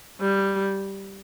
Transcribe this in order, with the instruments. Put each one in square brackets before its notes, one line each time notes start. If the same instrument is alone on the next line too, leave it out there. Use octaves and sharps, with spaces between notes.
[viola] G3